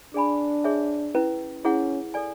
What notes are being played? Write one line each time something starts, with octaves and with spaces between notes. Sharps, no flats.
D4 G#4 D5 G#5 B5
G#4 C#5 E5 G#5
C#4 E4 B4
C#4 E4 G#4 C#5 F#5
A4 D5 G#5